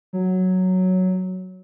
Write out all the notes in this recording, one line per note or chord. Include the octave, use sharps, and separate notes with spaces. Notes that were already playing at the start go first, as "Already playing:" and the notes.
F#3